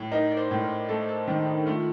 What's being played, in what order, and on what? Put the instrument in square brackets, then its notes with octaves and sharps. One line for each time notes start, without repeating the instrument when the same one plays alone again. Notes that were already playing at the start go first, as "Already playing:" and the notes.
Already playing: [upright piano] A2
[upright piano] D#4 [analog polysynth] A#4
[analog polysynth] D5
C5
[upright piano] A2
[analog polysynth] A#4
[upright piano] A3 [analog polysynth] A4
[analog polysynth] A4
[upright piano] D#3 [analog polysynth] D4
[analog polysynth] D#4
[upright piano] A3 [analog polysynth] F4